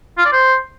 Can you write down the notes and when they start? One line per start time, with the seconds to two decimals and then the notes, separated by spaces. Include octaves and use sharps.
0.18 F4
0.25 D5
0.33 C5